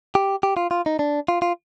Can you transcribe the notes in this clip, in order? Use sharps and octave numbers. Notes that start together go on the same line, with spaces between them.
G4
G4
F4
F4
D#4
D4
F4
F4